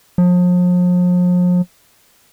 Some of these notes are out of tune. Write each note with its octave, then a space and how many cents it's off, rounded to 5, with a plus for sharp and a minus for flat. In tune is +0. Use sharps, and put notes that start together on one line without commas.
F3 +40